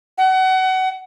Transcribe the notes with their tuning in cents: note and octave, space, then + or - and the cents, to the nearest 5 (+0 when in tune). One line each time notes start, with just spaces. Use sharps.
F#5 +25